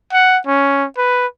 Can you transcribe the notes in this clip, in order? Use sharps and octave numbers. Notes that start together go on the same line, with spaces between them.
F#5
C#4
B4